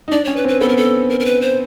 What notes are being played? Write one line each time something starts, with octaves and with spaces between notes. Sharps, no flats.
D#4
D4 D5
C#4 C#5
B4
C4
B4
B3 A4
A#4
A4
A#4
A#4
B4
C5